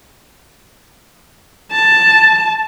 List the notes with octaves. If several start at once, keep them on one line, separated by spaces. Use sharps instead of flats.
A5